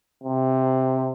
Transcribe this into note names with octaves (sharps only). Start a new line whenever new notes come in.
C3